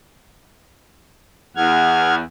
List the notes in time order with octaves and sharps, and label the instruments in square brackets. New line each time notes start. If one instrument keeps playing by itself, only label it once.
[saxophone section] E2 [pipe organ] F#5 F6 G#6